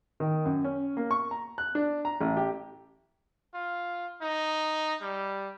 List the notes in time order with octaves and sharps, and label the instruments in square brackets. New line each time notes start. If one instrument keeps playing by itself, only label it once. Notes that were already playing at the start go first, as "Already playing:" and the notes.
[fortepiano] D#3
F#2
C#4
A#3
C#6
A#5
F#6
D4
A#5
A1
G4
[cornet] F4
D#4
G3